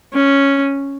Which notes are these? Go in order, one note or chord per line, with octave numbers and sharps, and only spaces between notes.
C#4